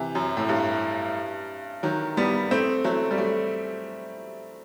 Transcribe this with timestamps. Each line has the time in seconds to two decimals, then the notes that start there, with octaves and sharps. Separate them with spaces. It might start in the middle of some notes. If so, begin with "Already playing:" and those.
Already playing: C3 E3
0.15 F#2
0.37 A2
0.49 G2
1.83 D#3 F#3
2.17 G3 B3
2.51 A3 C4
2.84 F#3 A3
3.11 G3
3.18 F#3 A3